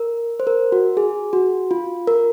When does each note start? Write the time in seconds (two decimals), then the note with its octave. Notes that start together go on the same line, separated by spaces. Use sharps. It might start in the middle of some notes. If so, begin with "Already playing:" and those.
Already playing: A#4
0.40 C5
0.47 A#4
0.72 F#4
0.97 G#4
1.33 F#4
1.71 F4
2.07 A#4